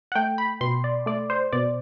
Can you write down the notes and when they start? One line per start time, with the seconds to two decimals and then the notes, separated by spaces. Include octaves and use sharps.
0.12 F#5
0.15 A3 G5
0.38 B5
0.61 B2 C6
0.84 D5
1.06 A3 D5
1.30 C5
1.53 B2 D5